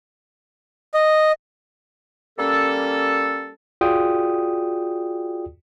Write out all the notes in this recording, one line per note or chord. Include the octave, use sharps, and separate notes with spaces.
D#5
G3 A#3 C#4 A4
F4 F#4 G#4 D5 G5 D#6